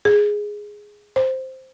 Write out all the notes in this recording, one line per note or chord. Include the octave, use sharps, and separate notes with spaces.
G#4
C5